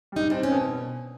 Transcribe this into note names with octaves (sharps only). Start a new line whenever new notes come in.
G3 D#4
C4 D4
C#4
B2